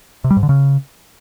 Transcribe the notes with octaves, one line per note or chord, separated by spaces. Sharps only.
C3
G3
G#2
D3
C#3